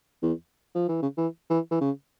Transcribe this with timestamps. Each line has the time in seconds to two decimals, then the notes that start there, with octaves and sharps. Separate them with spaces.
0.23 E2
0.75 F3
0.89 E3
1.02 C#3
1.17 E3
1.50 E3
1.71 E3
1.81 C#3